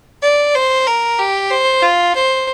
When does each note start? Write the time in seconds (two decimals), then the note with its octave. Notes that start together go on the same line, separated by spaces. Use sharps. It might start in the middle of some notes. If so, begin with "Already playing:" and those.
0.22 D5
0.55 C5
0.87 A#4
1.19 G4
1.51 C5
1.83 F4
2.15 C5